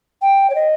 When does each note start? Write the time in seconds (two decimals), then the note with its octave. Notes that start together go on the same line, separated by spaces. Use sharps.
0.22 G5
0.50 C#5
0.55 D#5